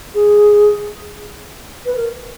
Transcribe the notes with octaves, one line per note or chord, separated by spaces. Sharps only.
G#4
B4
A#4